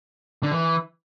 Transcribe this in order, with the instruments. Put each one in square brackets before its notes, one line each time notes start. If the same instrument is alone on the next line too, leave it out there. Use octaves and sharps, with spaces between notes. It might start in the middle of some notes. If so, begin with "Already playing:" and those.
[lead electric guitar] D3
E3